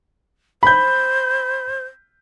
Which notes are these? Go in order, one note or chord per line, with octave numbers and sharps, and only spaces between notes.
C5 B5 G6